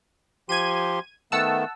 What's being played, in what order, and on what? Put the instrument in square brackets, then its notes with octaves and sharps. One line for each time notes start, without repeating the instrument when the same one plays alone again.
[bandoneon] F3 G4 C6 [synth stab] G#6 D#7
[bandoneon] D#3 A3 B3 [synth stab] F#5 A5 E6